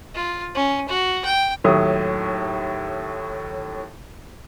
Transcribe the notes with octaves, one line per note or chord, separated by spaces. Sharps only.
F4
C#4
F#4
G5
D#2 A2 F#3 D#6